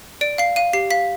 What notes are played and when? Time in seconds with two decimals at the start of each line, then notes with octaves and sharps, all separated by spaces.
0.21 D5 D7
0.38 F5 C7
0.56 F5 D#7
0.73 G4 C7
0.91 F5 B6